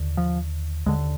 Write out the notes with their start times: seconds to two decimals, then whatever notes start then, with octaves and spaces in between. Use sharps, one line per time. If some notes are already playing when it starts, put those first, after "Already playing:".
Already playing: D#2 D3
0.17 F3
0.86 D#2 D3 G#3